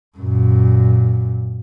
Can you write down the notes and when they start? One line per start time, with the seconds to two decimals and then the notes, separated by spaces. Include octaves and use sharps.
0.18 F#2 A#2